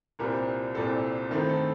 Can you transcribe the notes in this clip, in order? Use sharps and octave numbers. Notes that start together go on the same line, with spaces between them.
C2 A#2 G3 C4 A#4
C2 A#2 G3 C4 A4
G2 D#3 A3 C4 A#4
A4